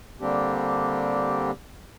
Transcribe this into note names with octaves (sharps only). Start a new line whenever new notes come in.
D3 G3 A#3 C4 D4 G4